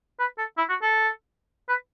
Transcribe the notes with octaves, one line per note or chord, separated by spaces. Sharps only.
B4
A4
E4
F#4
A4
B4